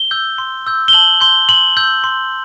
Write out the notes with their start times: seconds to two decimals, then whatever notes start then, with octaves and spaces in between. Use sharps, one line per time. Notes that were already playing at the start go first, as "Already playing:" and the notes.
Already playing: G7
0.11 E6 G6
0.38 C6
0.67 E6 G6
0.88 G7
0.93 A5 F#7
1.21 C6 G6 G7
1.49 C6 F#7
1.77 E6 G6
2.04 C6